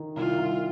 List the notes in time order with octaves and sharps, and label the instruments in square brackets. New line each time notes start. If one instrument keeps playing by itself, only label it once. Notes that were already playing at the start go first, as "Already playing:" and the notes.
Already playing: [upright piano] D#3
[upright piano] C2 [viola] F4
[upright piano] C2